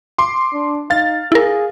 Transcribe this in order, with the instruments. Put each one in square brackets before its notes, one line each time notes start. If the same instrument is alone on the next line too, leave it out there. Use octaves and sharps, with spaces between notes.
[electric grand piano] C6 D6
[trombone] D4
[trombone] D#4 [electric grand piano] F5 A6
[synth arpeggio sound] E4 A#4 [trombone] G#4